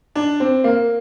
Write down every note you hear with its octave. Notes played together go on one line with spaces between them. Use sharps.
D4
C4
A#3